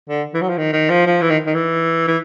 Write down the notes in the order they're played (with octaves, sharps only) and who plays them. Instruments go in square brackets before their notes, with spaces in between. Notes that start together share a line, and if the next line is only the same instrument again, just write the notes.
[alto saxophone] D3
E3
F#3
F3
D#3
D#3
F3
F3
E3
D#3
D#3
E3
E3